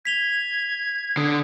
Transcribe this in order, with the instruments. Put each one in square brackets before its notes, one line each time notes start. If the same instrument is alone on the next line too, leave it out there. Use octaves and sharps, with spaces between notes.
[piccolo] G#6 [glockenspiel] B6 F7 G7
[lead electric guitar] D3 [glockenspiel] D#6